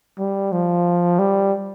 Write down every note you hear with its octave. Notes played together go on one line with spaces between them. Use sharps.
G3
F3
G3